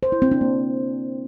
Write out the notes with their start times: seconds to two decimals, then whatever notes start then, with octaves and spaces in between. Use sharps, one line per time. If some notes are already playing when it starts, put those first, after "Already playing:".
0.03 C5
0.12 E4
0.22 C4
0.32 D4
0.41 A#3